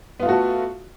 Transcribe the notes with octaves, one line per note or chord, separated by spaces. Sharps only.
A3 B3 F4 F#4 A4